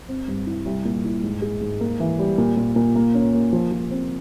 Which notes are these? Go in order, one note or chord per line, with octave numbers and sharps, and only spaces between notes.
C4
G2
E4
C2
A#2
E4
G#2
G#3
G#2
A#3
E3
G3
A#2
A#2
A#2
A#3
C#4
A#3
F3
F3
C4